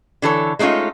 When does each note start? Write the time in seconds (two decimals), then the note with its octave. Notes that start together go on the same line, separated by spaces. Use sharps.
0.22 D3 E3 A4 C#5
0.59 G#3 A3 C#4 D#4 F4